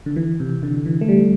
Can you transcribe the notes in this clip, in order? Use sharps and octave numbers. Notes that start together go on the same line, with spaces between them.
D3
E3
C3
D3
E3
A3
G3